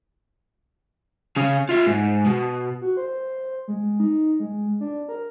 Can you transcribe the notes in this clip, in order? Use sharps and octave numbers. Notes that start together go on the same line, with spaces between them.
C#3 C#4
F4 E5
G#2
B2
F#4
C5
G#3
D#4
G#3
D4
A#4